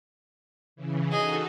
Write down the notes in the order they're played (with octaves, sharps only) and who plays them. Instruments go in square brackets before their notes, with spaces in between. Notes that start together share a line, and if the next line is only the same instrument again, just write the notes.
[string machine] C#3 E3
[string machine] D#4 F#4 A4 [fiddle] G#4 D#5